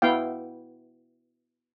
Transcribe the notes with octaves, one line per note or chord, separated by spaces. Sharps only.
B3 E4 F5 G5